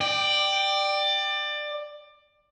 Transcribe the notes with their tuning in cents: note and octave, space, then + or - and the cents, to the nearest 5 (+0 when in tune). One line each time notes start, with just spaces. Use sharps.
D5 +20 G5 +0